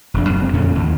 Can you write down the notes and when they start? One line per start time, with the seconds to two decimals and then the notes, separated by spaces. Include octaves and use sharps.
0.14 E1 F2 D4
0.29 F#2 C4
0.42 D2 A#3 C4
0.53 F2 A#2 D3 C#4
0.75 D#2 A2